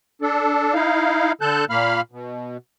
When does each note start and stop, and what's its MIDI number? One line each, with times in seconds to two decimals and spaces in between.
0.22 0.74 62
0.22 0.74 69
0.74 1.32 63
0.74 1.32 64
0.74 1.32 77
1.41 1.65 50
1.41 1.65 69
1.41 1.65 81
1.41 1.65 90
1.41 1.65 91
1.70 2.01 46
1.70 2.01 58
1.70 2.01 77
1.70 2.01 83
1.70 2.01 89
2.12 2.57 47